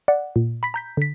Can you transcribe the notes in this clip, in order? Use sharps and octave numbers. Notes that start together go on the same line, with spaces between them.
D5 F#5
A#2
B5 B6
A#5 G6 B6
D3 B6